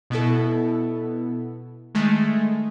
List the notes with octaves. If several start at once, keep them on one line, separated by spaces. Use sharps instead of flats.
B2 B3 E4 A4
D#3 G#3 A3